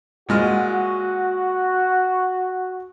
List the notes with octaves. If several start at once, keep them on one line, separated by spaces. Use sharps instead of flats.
A#2 G#3 F#4 F6